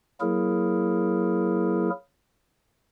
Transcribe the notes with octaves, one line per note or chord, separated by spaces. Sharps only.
F#3 A#3 E4 G#4 A#4